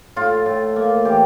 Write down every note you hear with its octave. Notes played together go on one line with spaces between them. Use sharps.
A2 F4
A2
A#3
E3 G4